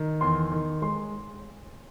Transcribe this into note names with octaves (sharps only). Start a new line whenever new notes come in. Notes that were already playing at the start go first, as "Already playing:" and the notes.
Already playing: D#3
E2 C6
D#3
G#3 C6